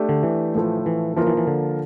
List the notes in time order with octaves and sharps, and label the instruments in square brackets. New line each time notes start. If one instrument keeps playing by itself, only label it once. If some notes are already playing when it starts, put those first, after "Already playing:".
Already playing: [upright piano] A3 D4 G4
[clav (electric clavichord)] D3
E3
[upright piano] A2 F3 A3
[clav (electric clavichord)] E3
[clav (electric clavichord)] E3 [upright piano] F3 A#3 F4 A#4
[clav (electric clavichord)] E3
E3
D3